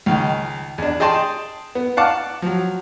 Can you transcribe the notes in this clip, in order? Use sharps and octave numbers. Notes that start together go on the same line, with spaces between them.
C#2 D#3
E2 D4
G#4 D#5 G5 A5 C6
B3
F5 F#5 A5 D6
F3 F#3